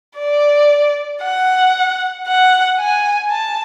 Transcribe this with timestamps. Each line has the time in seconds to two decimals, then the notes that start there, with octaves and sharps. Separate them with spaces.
0.18 D5
1.23 F#5
2.27 F#5
2.79 G#5
3.31 A5